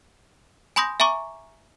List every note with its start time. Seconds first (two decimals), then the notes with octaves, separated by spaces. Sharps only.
0.76 G#5 B5 C6 D#6 G6 A#6
1.00 E5 G#5 A#5 C#6 D6